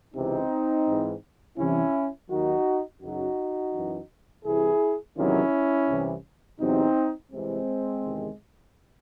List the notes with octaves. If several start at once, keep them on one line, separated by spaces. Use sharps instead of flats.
C#2 C3 E3 C4 D#4
G#2 E3
C2 C3 E3 C#4 E4
D#2 D#3 F#3 D#4 F#4
F#2 C#3 F#3 D#4 F#4
F#2 E3
C2 C3 E3 E4 G#4
E2 C3 D#3 F#3 C#4 E4
C2 C3 E3
E2 C3 F#3 C4 D#4
C2 C3 E3 G#3 C4
E2 C3 D#3